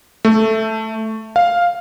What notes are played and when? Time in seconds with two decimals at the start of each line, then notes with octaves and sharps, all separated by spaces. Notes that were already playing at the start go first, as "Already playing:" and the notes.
0.25 A3
1.36 F5